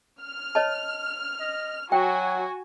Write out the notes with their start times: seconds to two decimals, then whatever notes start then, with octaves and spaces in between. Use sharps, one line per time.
0.20 F6
0.55 C#5 D#5 A5
1.40 D#5
1.92 F#3 F#4 G5 G#5